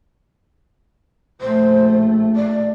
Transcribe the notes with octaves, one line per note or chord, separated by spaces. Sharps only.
A#1 A3 C5
D5